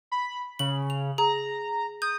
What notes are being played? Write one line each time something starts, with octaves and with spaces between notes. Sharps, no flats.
B5
C#3 F#7
F7
G#4 A#5
D#6 G6